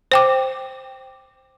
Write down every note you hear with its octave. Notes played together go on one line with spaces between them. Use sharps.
C5 G5 D6